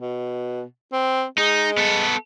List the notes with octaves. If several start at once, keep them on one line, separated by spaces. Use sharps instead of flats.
B2
C4
G#3 D#4
B3 A4